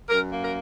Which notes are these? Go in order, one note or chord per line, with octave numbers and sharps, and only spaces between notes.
F#2 A#4
A#3
A#4